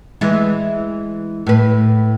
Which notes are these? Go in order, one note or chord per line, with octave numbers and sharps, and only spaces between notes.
E3 G#3
A2 B4